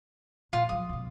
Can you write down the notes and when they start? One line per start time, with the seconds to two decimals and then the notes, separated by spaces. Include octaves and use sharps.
0.53 A#2 F4
0.69 F3 F#3 D#6
0.89 C#2 B2